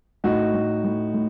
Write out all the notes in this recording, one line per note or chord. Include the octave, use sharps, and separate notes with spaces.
A2 D#4 F#4
A2
A2
A2